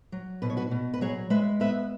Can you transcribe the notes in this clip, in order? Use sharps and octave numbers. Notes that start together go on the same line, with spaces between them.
F#3
B2 B4
C#5
F#4 B4
B2
B4
F#3 G#4 C#5
G#3 B4 E5
B3 B4 E5